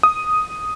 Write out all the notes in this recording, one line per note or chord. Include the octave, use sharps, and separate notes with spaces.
D#6